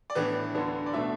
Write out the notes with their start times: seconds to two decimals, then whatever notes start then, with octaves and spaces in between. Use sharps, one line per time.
0.10 D5
0.15 A2 E3 B3 D4 B4
0.55 D2 D3 B3 D4
0.86 D5
0.93 B2 A3 D4 E5